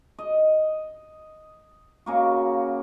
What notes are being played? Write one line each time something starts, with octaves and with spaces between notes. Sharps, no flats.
D#5
C#3 A#3 F#4